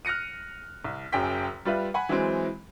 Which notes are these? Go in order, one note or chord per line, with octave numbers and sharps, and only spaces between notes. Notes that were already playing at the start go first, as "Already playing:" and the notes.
F6 F#6 A#6 C#7 D#7
C2
F#1 F#2 G#4 G5 B6
G3 F4 B4 E5
F#5 G#5 B5
E3 F#3 G#3 C4